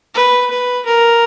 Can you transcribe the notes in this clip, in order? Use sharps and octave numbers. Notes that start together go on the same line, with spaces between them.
B4
B4
A#4